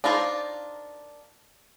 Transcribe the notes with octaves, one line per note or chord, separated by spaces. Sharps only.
D4 D#4 F4 A#4 C5